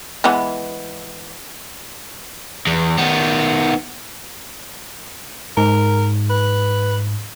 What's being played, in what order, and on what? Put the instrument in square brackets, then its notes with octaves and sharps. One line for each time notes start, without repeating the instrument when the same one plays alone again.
[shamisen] E3 G#3 B3
[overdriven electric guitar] E2
D#3 B3
[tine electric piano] G#2 [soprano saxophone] A#4
[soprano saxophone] B4